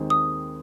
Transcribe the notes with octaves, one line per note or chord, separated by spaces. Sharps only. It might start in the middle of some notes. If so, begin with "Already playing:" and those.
Already playing: D#2 D#3 G#3 C4
D#6